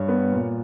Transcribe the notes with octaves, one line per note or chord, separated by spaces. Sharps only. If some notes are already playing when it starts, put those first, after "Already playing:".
Already playing: G2 C#5
B3
A#2